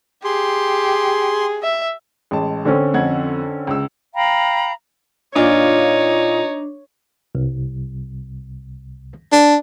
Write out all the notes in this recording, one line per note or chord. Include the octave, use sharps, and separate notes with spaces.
G4 G#4 C6
E5
A1 G#3 A5
D3 C4 C#4
F2 F#5 G#6
C#2 E6
F5 G5 A#5 B5
A#2 D4 D#4 F4 C#5 D5
C2
D4